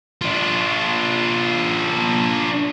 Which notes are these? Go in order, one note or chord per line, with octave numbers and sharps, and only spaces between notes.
D4 F4